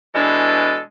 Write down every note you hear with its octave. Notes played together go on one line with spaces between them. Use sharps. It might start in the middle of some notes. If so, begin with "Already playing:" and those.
B2 E3 G#3 D4 A4